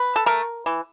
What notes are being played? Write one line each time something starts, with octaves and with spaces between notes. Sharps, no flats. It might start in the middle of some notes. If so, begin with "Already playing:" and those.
Already playing: B4
A4
A3 A#4
E3